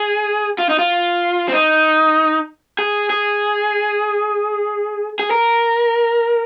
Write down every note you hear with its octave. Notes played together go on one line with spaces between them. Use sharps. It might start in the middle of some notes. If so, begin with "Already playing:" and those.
Already playing: G#4
F4
D#4
F4
C4
D#4
G#4
G#4
G#4
A#4